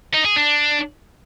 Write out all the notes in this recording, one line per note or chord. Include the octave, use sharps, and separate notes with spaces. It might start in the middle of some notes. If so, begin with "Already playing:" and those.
D#4
G#4
D4